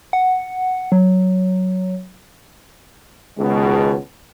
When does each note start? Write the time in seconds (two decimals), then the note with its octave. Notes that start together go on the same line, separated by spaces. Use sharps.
0.13 F#5
0.92 F#3
3.38 C#2 B2 D#3 G#3